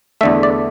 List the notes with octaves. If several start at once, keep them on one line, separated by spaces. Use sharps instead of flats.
E2 D3 A3 E5
D5